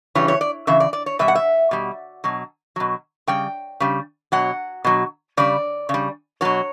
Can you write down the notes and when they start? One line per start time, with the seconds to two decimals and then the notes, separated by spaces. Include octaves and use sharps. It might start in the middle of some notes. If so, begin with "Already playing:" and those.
0.15 C#3 E3 G3 C#5
0.28 C#5
0.41 D5
0.67 C#3 E3 E5
0.80 D5
0.93 D5
1.06 C#5
1.19 B2 G3 E5
1.28 F#5
1.35 E5
1.71 B2 G3
2.24 B2 F#3
2.76 B2 F#3
3.27 C#3 G3 G5
3.80 C#3 G3
4.32 B2 F#3 F#5
4.84 B2 F#3
5.37 C#3 G3 D5
5.89 C#3
5.94 G3
6.41 B2 F#3 C#5